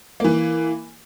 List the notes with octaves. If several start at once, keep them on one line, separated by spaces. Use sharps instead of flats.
E3 A#3